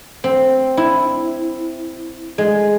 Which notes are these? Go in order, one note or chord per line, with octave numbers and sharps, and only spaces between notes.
C4
E4
G#3